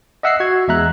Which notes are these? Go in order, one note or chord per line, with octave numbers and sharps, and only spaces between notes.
D#5 E5 F#5 E6 F#6 C7
F#4 G#6
E2 G#3 E5 A#5 F#6